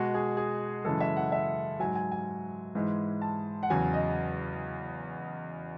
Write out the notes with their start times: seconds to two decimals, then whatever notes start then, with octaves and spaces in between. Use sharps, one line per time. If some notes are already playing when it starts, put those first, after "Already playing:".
Already playing: B2 G#3 F#4
0.14 G#4
0.37 G#4
0.84 F#2 C#3 E3 G#3 A4
1.00 E5
1.16 F#5
1.32 E5
1.80 G#2 F#3 G#5
1.96 G#5
2.12 G#5
2.75 G#2 E3 G#3
3.21 A5
3.63 F#5
3.70 E2 C#3 F#3 G#5
3.93 D#5